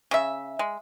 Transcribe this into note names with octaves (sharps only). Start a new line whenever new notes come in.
C#3 E5
G#3